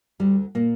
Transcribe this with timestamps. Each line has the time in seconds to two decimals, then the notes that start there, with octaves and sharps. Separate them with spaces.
0.20 D2 D3 G3
0.55 A#2 A#3